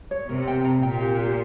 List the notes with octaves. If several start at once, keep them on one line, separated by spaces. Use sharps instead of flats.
C#5
C3 A#4
G5
A#5
A#2 G5
G4
G4